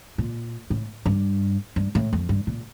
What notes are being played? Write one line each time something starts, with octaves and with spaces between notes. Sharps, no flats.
A#2
A2
G2
G2
A2
F2
G2
A#2